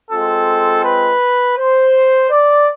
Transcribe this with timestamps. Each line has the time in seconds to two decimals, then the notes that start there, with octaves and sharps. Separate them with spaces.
0.11 G#3 C4 F4 A4
0.84 B4
1.57 C5
2.30 D5